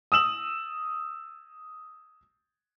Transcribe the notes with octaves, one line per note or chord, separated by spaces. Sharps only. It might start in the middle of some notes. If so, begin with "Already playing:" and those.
D#6 E6 E7 F#7